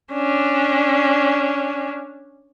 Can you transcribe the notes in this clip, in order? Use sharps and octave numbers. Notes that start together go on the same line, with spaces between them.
C#4 D4